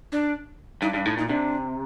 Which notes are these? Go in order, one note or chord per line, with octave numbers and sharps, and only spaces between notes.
D4
G2 D#4
G2 D4
A2 D#4
A#2 D#4
C3 D4